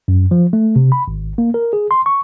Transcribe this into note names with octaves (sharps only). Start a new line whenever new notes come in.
F#2
F3
A3
C3
B5
G#1
A#3
A#4
G#4
C6
C#6